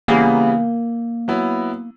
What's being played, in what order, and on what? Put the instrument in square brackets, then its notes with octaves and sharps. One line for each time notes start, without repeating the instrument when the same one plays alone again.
[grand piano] C#3 E3 G3 B3 [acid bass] A#3
[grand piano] F#3 B3 E4